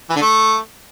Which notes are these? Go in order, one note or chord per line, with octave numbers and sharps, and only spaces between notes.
E3
D3
A3